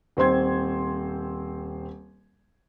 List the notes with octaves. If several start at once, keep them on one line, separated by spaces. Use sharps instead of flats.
D#1 C4 C5 C6 G#6